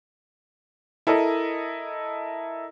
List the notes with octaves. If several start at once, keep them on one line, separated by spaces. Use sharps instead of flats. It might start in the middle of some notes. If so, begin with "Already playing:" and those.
E4 A4 A#4 D#5